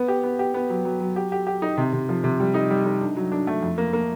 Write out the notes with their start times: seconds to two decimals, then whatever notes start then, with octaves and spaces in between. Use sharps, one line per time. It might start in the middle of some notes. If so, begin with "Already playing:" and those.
Already playing: B3
0.08 G4
0.23 B3
0.39 G4
0.54 B3
0.70 F#3
0.85 F#3
1.00 F#3
1.16 G4
1.32 G4
1.47 G4
1.62 D#4
1.77 C3
1.93 C3
2.09 F3
2.24 C3
2.40 G3
2.54 D#4
2.70 G3
2.85 D#4
3.01 D4
3.16 F#3
3.32 D4
3.47 A3
3.62 F2
3.78 A#3
3.93 A#3